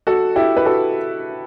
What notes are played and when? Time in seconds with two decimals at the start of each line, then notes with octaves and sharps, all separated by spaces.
0.07 F#4 A4
0.36 E4 G4
0.57 B4
0.65 F#4 A4